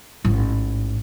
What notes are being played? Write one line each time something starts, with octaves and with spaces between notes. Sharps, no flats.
A1 G#2